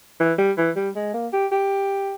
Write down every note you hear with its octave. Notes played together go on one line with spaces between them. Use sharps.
E3
G3
E3
G3
G#3
A#3
G4
G4